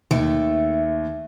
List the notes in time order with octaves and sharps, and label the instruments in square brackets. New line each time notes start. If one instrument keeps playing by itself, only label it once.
[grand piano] D#2 [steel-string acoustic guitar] A3